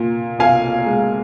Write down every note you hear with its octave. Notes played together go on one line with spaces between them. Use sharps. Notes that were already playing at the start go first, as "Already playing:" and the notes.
Already playing: A#2
B1 F5 G#5
G#3